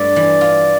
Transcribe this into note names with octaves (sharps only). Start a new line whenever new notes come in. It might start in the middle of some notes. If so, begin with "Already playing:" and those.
Already playing: G2 A3 D5
E3
F4